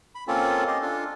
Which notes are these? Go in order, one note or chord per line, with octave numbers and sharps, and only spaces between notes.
B5
A#3 C4 C#4 F4 A4
G4 D#5 C6
D4 F4 A4